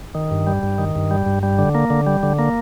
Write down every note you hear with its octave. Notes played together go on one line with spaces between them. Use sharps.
D#3
G2
G3
G2
D#3
G2
G3
G2
G3
D3
A#3
D3
G3
D3
A#3